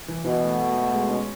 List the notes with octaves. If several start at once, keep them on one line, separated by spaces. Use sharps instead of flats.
E3
B2 E3
A3
A3
A3
G#3
C#4